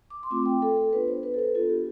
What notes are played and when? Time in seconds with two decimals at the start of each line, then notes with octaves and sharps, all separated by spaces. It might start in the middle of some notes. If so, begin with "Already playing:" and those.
0.10 D6
0.23 C6
0.30 A3 C4 F4 D6
0.46 G5
0.62 A4
0.77 A4
0.93 B3 D4 F4 B4
1.08 C5
1.23 B4
1.34 A4
1.39 B4
1.55 B3 D4 F4 A4
1.70 G4